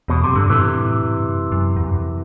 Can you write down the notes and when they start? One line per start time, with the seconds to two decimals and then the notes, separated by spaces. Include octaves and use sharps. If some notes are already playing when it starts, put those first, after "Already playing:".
0.08 E2 B2
0.23 F#2 C3
0.35 G2 D3
0.50 A2 C3 E3
1.01 F#2
1.10 G2
1.20 F#2
1.52 F#2
1.76 E2
1.84 F#2
1.90 E2